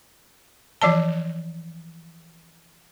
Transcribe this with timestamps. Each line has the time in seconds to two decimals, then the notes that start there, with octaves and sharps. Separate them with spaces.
0.82 E3 F3 D5 A5